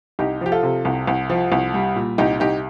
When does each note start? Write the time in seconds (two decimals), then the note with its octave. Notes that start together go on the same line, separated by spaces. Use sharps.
0.19 C2 D#4 G4
0.41 F3 G4
0.52 F4 A4
0.63 C3
0.85 C2
1.07 C2
1.30 F3
1.52 C2
1.74 G3
1.96 A#2
2.18 C2 D#4 G4
2.40 C2 D#4 G4